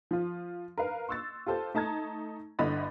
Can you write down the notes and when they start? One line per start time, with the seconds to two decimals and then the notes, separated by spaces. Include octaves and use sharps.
0.11 F3 F4
0.78 A#4 B4 F5
1.09 C6 C#6 E6 F#6 A6
1.46 F4 G4 A4 C5 A5
1.75 A3 D#4 A5 A#5 G#6
2.59 G1 D3 E4 D#5 B5 A6